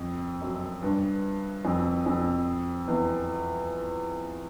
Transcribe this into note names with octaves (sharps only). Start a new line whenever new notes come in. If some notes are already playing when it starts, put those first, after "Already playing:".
Already playing: F2
F#2
G2
F2
F2
E2